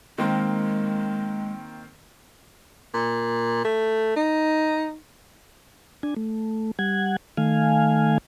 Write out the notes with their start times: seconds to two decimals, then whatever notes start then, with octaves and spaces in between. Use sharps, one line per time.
0.18 D#3 G#3 A#3 C4
2.94 A#2
3.65 A3
4.16 D#4
6.03 D4 G#5
6.16 A3
6.79 G3 F#5 G#6
7.37 D#3 A3 F5 G#5